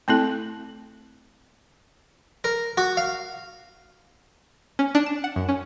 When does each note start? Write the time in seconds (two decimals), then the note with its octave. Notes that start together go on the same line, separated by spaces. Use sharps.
0.08 A3 C4 E4 A4
2.44 A#4
2.77 F#4
2.97 F5
4.79 C#4
4.95 D4
5.06 E7
5.24 F#5
5.36 F#2
5.49 C#4